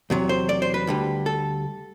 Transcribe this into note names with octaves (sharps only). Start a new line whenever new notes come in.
E2 C3 F#3
C5
D5
C5
B4
D2 D3 G3
A4